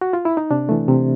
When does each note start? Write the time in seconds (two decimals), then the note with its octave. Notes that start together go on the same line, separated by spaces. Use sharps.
0.01 F#4
0.13 F4
0.25 E4
0.37 D#4
0.51 C3 D4
0.69 E3 A3
0.88 C3